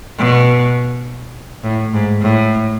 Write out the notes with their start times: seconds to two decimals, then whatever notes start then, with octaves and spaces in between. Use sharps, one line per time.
0.18 B2
1.64 A2
1.93 G#2
2.21 A2